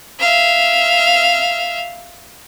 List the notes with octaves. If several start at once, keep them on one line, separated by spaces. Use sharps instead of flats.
E5 F5